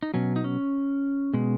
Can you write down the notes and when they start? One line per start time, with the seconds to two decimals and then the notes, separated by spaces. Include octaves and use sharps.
0.03 D#4
0.14 B2 F#3 C#4
0.36 D#4
0.44 C#4
1.34 B2 G#3